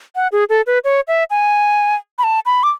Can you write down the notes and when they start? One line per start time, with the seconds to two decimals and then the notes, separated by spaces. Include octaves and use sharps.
0.15 F#5
0.32 G#4
0.49 A4
0.67 B4
0.84 C#5
1.08 E5
1.30 G#5
2.18 B5
2.24 A5
2.46 B5
2.63 D6